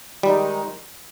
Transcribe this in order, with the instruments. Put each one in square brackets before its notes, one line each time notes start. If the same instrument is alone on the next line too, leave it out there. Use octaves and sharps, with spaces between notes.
[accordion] D#3 G#3 D#4 [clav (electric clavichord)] G3